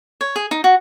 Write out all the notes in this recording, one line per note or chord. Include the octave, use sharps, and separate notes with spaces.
C#5
G#4
D#4
F#4